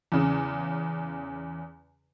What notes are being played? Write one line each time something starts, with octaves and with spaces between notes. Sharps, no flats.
E2 C#3